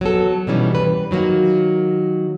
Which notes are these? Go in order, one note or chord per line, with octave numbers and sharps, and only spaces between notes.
F#3 B3 A4
B2 D#3 E3 G3 C#4
G3 B4
D#3 F#3 G3 A#3 F#4